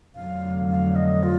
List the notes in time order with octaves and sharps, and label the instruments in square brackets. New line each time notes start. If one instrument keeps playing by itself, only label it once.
[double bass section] F1 F2 D3 F#3 [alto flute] F5
[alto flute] F5
D#5
F4